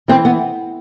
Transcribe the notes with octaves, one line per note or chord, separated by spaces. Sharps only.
E3 C4
B3